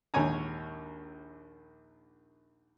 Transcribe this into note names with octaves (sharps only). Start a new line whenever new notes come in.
A#1 D#2 G#2 C#5 G#5 A#5